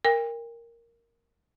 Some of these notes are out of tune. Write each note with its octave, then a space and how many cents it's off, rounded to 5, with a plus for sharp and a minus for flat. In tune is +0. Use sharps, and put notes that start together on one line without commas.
A#4 +0 G5 +40